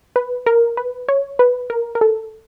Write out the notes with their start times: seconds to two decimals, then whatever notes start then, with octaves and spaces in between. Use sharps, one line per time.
0.16 B4
0.46 A#4
0.77 B4
1.08 C#5
1.39 B4
1.70 A#4
1.95 A#4
2.01 A4